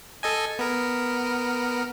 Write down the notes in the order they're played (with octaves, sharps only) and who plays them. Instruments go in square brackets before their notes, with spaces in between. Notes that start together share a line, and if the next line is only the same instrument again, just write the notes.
[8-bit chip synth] A4 D#5 G#5
B3 A#4